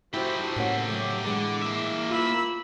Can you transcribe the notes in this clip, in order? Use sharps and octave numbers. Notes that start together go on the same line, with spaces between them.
E4 F#4 G4 A4 C5
A2 A#3 C#4 F#5
F#3 A3 D6
D3 E3 G#3 B3
A#3 E5
F4 B5 E6